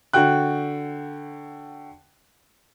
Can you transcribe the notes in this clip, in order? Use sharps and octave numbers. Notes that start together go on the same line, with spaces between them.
D3 F#4 G5 F#6